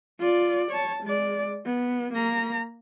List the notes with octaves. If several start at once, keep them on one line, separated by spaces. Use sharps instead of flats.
F4 D5
C#5 A5
G#3 D5
B3
A#3 A#5